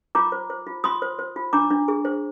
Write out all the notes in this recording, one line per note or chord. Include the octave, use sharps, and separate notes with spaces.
F4 A#5 D6
C5
C5
F4
F4 C6 D#6
C5
C5
F4
D4 A#5 D6
D4
G#4
C5